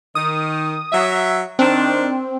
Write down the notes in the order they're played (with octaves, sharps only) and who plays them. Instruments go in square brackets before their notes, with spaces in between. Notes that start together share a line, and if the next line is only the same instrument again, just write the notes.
[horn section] D#3 [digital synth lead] D#6
[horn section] F#3 E5
[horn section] D#3 D4 [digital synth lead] C4